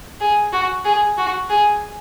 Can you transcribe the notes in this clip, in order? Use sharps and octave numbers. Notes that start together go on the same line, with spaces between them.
G#4
F#4
G#4
F#4
G#4